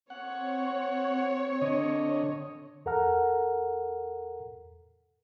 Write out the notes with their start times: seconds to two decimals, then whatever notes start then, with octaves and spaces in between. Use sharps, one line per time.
0.10 C4 C#5 F#5
1.62 D3 D#5
2.86 E2 A4 A#4 F#5 A#5 F6